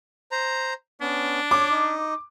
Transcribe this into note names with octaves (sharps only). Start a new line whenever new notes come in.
C5 A#5
B3 C#4 D4
C#5 D6
D#4